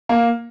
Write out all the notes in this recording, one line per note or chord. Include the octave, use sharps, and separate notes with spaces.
A#3